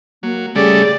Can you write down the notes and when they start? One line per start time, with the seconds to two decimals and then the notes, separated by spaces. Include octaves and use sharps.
0.23 F#3 A#3
0.55 C#3 G3 A3 G#4 D5